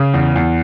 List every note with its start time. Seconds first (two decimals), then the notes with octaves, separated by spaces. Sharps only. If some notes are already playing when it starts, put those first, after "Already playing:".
Already playing: C#3
0.14 E2
0.35 E2